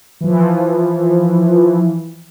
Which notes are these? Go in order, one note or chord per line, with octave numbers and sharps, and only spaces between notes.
E3 F3